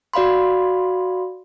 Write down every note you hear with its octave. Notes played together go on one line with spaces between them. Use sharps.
F#4 D5 F5 B5 C6